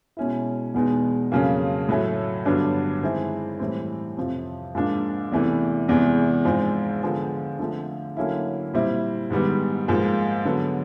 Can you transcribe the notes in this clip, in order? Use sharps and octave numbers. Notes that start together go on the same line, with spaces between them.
B2 G#3 C#4 E4
E2 B2 G#3 B3 D#4
F2 C#3 F#3 A#3 C#4
A2 F#3 A3
G2 D3 F#3 B3 D4
D#3 G#3 C4 E4
A2 E3 G3 C4
F2 C3 F3
G#2 F3 A#3 D4
E2 C3 E3 A3
E2 C3 E3 G#3
G#2 F3 G#3 C4 D#4
D3 F3 G#3 B3
D3 F3 A3 C4
D3 F#3 A#3 C#4 E4
A#2 G3 C4 E4
G#2 D#3 G3 B3
G#2 F3 A#3
D3 F#3 B3